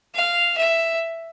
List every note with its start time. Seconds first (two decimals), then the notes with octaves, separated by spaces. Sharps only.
0.15 F5
0.58 E5